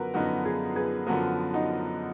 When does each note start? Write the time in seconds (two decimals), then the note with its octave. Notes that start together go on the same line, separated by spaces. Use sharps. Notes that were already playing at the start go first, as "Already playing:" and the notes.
Already playing: F#2 D3 F3 B3 F#4 A#4 B4
0.14 F#2 D3 F3 B3 D#4 F#4
0.45 F4 G#4
0.76 G#4 B4
1.07 F#2 D3 F3 B3 F#4 A#4
1.53 D#4 F#4